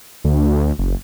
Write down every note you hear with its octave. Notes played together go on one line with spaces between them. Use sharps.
D2
F#1